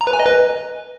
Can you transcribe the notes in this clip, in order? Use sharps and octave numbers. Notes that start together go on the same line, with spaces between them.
A#5
B4
G#5
D#5
B4